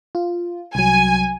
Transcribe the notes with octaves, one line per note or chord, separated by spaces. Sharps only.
F4
C2 F#3 G#5